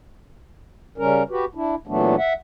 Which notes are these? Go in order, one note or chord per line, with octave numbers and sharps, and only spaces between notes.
C#3 G3 C#4 A#4
F#4 G4 B4
D4 E4
A#2 E3 F#3 A3 B3 D4
E5 F#5